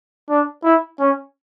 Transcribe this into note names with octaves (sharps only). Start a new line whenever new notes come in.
D4
E4
C#4